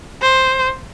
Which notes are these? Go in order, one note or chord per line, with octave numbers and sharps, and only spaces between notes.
C5